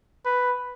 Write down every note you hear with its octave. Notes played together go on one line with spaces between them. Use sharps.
B4